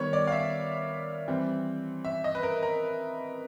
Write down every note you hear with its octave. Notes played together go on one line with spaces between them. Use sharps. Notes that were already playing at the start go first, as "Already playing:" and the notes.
Already playing: D#3 G3 B3 C#5
D5
F5
E5
E3 G3 C4
E5
D#5
B4
A#4
A#4